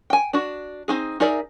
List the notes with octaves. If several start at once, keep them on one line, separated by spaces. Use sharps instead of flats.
G5 G#5
D4 F#4
C4 D#4 G#4
D#4 G#4 A#4 D5 E5